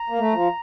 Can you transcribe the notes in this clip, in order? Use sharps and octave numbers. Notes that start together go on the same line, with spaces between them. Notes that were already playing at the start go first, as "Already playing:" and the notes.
Already playing: A#5
A#3
A3
F3